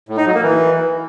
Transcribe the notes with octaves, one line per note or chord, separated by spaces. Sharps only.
A2
D#4
F#3
A#3
E3